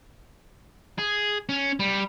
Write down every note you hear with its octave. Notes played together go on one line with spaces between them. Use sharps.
G#4
C#4
G3